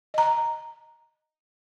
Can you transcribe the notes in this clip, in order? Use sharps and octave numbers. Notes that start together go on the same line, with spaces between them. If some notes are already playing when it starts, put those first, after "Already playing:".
D#5 A#5